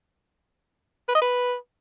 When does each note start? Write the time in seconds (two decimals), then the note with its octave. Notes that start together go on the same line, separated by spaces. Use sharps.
1.09 B4
1.15 D#5
1.21 B4